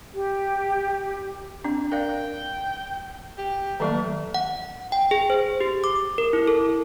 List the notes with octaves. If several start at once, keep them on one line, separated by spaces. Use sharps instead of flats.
G4
C4 D4
A#4 D5 F5 G5
G4
D#3 F#3 A3 A#3
F#5
G5
G#4
C5
G4
D6
A#4
E4
A4